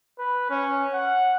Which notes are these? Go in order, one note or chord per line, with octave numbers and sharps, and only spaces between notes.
B4
C#4
F#5